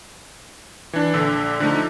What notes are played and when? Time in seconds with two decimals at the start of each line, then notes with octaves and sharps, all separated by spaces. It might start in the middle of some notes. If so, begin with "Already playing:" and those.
0.93 E3 D4
1.14 A#1 D3 E6
1.60 D3 F3 A3 D#4